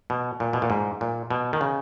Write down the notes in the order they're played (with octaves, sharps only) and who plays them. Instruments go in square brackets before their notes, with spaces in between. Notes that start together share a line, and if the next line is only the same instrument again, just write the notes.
[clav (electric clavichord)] B2
A#2
B2
A#2
G#2
A#2
B2
D#3
C#3